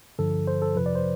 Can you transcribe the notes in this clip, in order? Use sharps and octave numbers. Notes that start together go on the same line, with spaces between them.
G2 D3 F3 A4
C5
A4
F2 C3 F3 B4
D5
C5